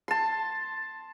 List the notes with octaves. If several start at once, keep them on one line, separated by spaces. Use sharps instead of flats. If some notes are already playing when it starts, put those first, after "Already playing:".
A5 C6